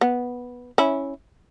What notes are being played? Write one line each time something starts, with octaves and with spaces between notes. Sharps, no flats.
B3
C#4 E4